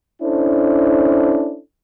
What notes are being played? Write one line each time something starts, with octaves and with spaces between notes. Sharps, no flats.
C#4 D4 E4 A4 C5